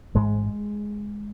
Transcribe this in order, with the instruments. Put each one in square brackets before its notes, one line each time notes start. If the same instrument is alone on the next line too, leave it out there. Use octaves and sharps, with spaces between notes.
[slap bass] A1 G#2 G#3